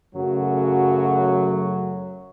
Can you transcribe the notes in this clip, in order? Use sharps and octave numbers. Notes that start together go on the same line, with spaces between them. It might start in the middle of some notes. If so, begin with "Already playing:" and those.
F#2 C#3 F#3 A3 F#4